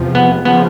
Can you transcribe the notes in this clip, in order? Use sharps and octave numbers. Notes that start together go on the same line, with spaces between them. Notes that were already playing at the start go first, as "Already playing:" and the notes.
Already playing: E2 C3 F3
B3
C#3 F3 B3